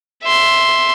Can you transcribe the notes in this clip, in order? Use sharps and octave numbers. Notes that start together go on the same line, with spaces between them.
E5 C6